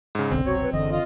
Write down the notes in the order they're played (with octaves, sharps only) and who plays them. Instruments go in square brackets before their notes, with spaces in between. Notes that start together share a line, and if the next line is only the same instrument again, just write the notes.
[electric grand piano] G#2 C#3
[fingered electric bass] F#1 C2 B2 [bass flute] D3 [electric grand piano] C4
[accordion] F#3 C#5 [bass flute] F#4
[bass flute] B4
[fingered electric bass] F#1 E3 [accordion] E2 D#5 [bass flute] D3
[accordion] F4 D#5